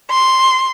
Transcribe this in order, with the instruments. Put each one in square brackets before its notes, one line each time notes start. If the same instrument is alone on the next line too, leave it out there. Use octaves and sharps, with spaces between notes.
[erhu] C6